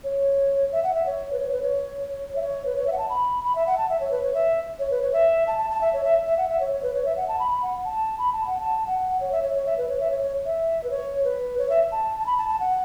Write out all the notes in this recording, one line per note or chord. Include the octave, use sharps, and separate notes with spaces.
C#5
E5
F#5
E5
C#5
B4
C#5
B4
C#5
E5
C#5
B4
C#5
E5
F#5
A5
B5
B5
E5
F#5
A5
E5
C#5
B4
C#5
E5
C#5
B4
C#5
E5
A5
A5
A5
E5
C#5
E5
E5
F#5
E5
C#5
C#5
B4
C#5
E5
F#5
A5
B5
B5
F#5
A5
B5
A5
F#5
A5
F#5
C#5
E5
C#5
C#5
E5
B4
C#5
E5
C#5
C#5
E5
B4
C#5
B4
C#5
E5
A5
A5
B5
A5
A5
F#5